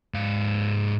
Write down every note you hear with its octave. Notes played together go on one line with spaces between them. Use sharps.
G#2 F5